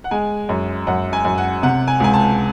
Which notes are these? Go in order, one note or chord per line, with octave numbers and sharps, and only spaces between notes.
F#5
G#3 G#5
F#2
F#2 F#5
G#5
F#2
F#5
C3 F#5
G#5
C#2 G#5
A5